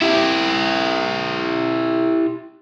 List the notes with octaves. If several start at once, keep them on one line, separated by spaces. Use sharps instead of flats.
E4 G4